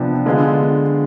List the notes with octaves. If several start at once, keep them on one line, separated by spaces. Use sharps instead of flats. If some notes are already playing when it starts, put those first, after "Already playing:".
Already playing: C3 F3 B3 D4
D3 G#3 B3 F4